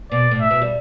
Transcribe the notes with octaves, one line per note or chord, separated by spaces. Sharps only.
B2 D5
A2
E5
B2
G3